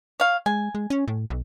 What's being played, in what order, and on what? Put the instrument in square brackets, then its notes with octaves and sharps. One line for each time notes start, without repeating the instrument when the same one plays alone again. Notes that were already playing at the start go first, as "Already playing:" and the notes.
[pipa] C#5 F5
[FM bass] G#3 [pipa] G#5
[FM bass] G#3
C#4
A2
B1